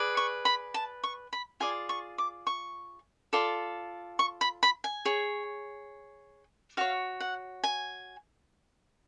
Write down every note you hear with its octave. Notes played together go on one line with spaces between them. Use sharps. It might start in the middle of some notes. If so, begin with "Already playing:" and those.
Already playing: G#4 B4 D5
C#6
B5
A5
C#6
B5
F4 G#4 D5 G#5
C#6
D6
C#6
F4 A4 D5
C#6
B5
B5
G#5
G#4 C#5
F#4 C#5 F5
F#5
G#5